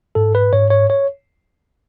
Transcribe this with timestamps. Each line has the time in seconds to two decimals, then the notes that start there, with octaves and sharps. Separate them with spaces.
0.15 G#2 A4
0.35 B4
0.53 G#2 C#5
0.70 C#5
0.90 C#5